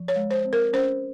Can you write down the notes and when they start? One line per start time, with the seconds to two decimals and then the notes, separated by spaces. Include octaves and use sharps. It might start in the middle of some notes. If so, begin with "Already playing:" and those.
Already playing: F3
0.08 C#5
0.16 G#3
0.31 C5
0.45 C4
0.53 A#4
0.73 C#4 C5